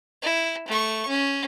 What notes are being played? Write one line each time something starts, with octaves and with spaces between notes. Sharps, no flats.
E4
A3 C#6
C#4